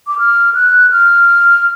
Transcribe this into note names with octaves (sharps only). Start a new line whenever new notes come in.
D6
F6
F#6
F6